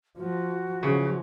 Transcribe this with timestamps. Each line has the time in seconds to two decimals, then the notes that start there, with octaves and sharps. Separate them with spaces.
0.17 F3 F#4
0.83 C#3 E3 F3